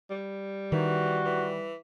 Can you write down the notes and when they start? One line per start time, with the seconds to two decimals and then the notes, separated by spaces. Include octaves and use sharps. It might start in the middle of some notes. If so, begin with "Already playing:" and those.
0.10 G3
0.72 D#3 E3 F#4
1.25 E3